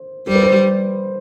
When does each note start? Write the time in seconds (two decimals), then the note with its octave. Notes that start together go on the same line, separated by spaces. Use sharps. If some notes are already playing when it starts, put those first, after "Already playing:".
Already playing: C5
0.27 G3 C5
0.35 B4
0.43 C5